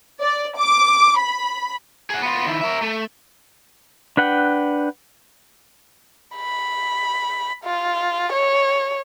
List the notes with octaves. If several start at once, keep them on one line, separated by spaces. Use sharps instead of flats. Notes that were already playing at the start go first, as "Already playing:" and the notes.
D5
D6
B5
G#4 F#5
B3 F4
D#3 E4
A#4 E5
A3
D4 B4 F#5 G5
B5
F4
C#5